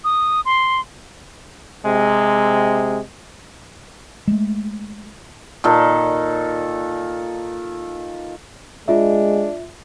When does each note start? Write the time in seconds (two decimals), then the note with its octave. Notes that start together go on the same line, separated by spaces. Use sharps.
0.04 D#6
0.45 C6
1.86 C3 G#3
4.28 G#3 A3
5.64 A#2 D#3 A4
8.88 G#3 D4 F4 E5